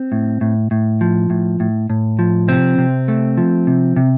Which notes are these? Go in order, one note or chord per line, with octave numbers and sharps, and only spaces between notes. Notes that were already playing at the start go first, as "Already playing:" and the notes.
Already playing: C4
A2
A2
A2
F3
A2
A2
A2
F3
C3 C4
C3
A3
F3
C3
C3